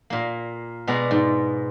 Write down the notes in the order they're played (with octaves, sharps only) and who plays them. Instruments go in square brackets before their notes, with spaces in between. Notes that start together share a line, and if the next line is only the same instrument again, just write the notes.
[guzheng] A#2 A#3
B2 G#3 B3 D5 A#5
G#2